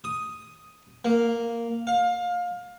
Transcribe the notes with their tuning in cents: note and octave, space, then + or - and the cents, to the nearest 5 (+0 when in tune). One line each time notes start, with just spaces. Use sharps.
D#6 +5
A#3 -5
F5 +25